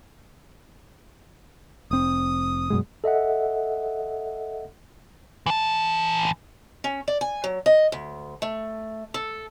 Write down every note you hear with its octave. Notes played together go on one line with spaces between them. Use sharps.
F1 C4 D#6
F#2 B2 G#3
A4 D#5 E5 F#5
E3 A5
C#4
D5
G#5
F#3
D#5
D2
A3
A4